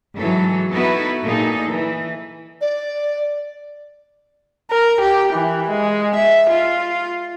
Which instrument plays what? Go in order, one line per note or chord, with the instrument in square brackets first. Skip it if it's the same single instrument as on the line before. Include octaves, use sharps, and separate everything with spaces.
[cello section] G#2 E3 F#3 A4
B3 D#4 E4 F#4 A4 B4
A#2 A#3 D#4 G#4 A4
E3
[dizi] D5
[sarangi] A#4
G4
E3
G#3
E5
F4